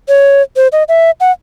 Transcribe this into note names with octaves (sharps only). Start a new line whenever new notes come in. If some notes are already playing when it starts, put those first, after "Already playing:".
C#5
C5
D#5
E5
F#5